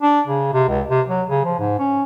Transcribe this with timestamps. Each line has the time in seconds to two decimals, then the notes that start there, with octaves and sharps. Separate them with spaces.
0.01 D4
0.27 C#3
0.53 C3
0.69 C#2
0.90 C3
1.09 F#3
1.29 C#3
1.45 F3
1.59 G#2
1.79 C#4